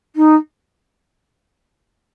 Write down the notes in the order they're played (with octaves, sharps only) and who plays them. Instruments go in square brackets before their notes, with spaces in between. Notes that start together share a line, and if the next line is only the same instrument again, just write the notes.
[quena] D#4